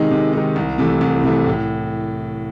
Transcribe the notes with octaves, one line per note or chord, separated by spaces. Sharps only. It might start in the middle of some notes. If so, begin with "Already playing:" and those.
Already playing: C3 D#3 G#3 D#4
C3
D#3 G#3 D#4
C2
C3 E3 A3
C2
C3 E3 A3
A2